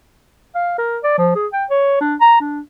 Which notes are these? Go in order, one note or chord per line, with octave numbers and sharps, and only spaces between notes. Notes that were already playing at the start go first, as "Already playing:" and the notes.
F5
A#4
D5
F3
G#4
G5
C#5
D4
A#5
D4